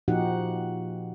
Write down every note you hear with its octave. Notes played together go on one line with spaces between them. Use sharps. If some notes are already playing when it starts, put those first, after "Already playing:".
A#2 F3 D#4 F#4 G4 F#5